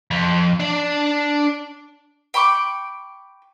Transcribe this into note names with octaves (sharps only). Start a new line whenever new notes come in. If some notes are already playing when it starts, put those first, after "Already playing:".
F2
D4 D5
G5 B5 C#6 D6